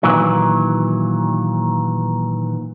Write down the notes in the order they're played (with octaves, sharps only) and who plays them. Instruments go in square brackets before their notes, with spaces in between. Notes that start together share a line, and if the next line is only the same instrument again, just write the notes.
[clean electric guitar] A#2 D#3 E3 F#3